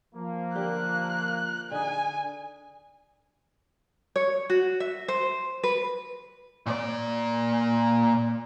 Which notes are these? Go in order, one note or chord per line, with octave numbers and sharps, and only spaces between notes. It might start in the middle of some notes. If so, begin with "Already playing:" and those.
F3 A#3
D3 G4 A#4 F#6
D3 D#4 G#4 G#5
C#5
F#4
E5
C5
B4
A#2 D5